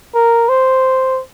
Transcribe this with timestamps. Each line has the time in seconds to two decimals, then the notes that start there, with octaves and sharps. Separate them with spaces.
0.15 A#4
0.49 C5